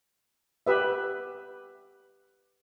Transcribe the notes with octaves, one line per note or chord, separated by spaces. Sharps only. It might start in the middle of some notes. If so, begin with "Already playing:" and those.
G4 B4 E5